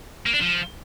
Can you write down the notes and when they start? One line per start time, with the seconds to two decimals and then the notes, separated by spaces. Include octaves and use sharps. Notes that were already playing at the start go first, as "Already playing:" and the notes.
0.26 A#3
0.33 D4
0.41 F3